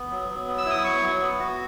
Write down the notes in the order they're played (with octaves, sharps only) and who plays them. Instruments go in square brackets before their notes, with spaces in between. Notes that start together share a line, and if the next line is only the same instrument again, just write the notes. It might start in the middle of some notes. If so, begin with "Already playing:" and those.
Already playing: [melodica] B3
F#3
F#3
B3
E6
E4 D#6
F#3 C#6
F#3
B3
F#4